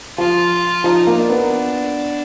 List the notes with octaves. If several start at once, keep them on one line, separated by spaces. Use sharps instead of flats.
F3 F4
F3 D#4
A#3
D4
B3